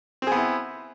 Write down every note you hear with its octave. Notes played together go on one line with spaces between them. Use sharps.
B3 C4 E4 G#4